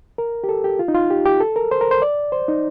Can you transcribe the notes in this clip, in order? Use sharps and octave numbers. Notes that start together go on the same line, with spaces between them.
A#4
G4
A4
G4
F4
D#4
F4
G4
G4
A4
A#4
C5
A#4
C5
D5
C5
D#4